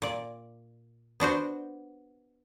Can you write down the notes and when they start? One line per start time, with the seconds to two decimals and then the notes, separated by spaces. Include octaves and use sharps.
0.02 A#2 D5
1.20 B3 D4 F#4 C5